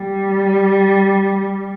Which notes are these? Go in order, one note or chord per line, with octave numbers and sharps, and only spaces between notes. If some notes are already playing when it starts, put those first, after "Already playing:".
Already playing: G3